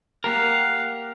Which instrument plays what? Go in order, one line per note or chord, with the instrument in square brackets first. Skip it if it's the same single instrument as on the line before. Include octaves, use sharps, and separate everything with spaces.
[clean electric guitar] A#3 G4 A#4 [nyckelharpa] F5 F#5